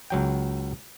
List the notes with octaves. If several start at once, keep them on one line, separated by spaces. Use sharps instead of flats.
C#2 F#3 G5